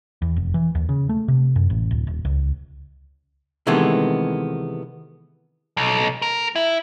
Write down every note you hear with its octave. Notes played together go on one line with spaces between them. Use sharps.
E2
F1
E3
D#2
C#3
A3
C3
F#2
A1
D1
D#1
C#2
C3 D#3 E3 G#3 A3 B3
B1
A#4
E4